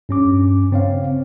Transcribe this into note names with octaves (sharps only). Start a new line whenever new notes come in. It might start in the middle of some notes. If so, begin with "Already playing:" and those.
G2 C#4 D6
C#3 C4 C#5 F5